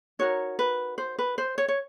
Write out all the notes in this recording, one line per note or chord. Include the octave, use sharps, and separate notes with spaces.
D#4 F#4 A#4 C#5
B4
C5
B4
C5
C#5
C#5